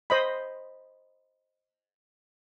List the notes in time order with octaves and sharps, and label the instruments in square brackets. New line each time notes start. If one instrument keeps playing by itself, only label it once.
[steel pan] C5 D#5 B5